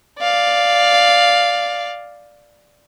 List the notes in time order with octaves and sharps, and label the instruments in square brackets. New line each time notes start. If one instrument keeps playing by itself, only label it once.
[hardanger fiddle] D5 F5